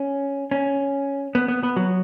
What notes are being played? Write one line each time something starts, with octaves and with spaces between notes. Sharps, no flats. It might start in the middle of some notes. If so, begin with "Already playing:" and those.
Already playing: C#4
C#4
B3
B3
B3
F#3